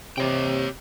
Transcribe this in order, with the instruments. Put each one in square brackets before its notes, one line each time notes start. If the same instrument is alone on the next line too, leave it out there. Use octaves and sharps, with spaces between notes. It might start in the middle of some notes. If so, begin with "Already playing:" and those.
[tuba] C3 [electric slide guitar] G4 C#5 G5